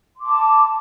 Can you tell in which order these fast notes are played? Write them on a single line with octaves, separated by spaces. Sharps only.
C6 D6 A5